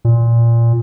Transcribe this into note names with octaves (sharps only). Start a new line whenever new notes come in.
A#2